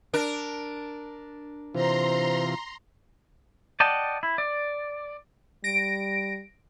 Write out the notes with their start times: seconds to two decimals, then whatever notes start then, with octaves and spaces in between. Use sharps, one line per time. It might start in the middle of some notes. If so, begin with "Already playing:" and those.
0.14 D4 A#4
1.75 C3 E3 F4 C5 A#5 C6
3.80 D5 D#5 F#5 G5 A5
4.23 E4
4.38 D5
5.64 G3 A#6 D7